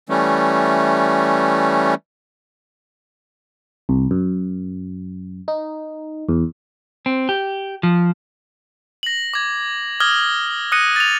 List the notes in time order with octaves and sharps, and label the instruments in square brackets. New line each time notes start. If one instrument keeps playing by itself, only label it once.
[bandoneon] E3 G3 A3 C#4
[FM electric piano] C2
F#2
D#4
E2
[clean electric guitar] C4
G4
F3
[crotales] A#6 F#7
D6 G#6
D6 D#6 F6 G#6 A#6 G7
D#6 F#6 A#6 C#7 D#7
A6 F7